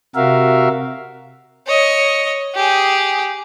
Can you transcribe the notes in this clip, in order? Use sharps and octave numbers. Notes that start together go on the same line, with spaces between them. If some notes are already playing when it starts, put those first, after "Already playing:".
C3 F#4 A#4 E5 F5
C#5 D#5
G4 G#4